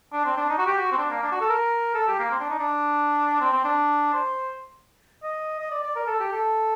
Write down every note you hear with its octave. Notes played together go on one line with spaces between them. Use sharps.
D4
C4
D4
D#4
F#4
G4
F#4
C4
D4
A#3
D4
F#4
A4
A#4
A4
G4
A#3
C4
D4
D#4
D4
C4
C4
D4
C5
D#5
D#5
D5
D5
A#4
A4
G4
A4